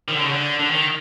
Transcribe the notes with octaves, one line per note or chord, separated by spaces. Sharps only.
D#3
D3
C#3
D3
D3
D#3